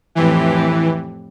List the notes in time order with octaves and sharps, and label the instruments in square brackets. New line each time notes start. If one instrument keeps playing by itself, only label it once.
[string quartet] F2 A2 G4 [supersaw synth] E3